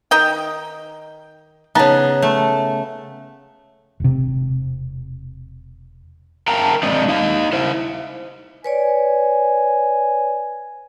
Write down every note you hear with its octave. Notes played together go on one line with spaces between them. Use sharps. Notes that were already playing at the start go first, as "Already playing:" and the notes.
D#3 D#5 G5
C#3 B3 D#4 A5
A3
E1 C3
A#4 F5 G5 A5 A#5
G#3 C4 G4 C5 D5 D#5
D#4 D#5 F5
E4 C5
B4 C#5 D5 G#5